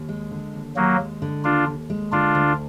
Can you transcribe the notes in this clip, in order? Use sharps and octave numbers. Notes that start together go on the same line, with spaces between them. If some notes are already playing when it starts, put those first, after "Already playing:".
Already playing: D#2
G#3
D3
D#2
D#2 F#3 A#3
G#3
D3
D#2 D4 F4
D#2
G#3
D3 D4 F4
D2